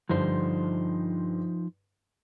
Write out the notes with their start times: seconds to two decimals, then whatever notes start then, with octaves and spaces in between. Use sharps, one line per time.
0.09 G2 D3 F3 D#4 C5